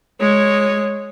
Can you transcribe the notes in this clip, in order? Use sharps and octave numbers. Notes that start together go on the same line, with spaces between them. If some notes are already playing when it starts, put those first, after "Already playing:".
G#3 C#5